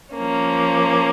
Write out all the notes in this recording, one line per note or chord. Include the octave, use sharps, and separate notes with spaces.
F3 A#3 C#4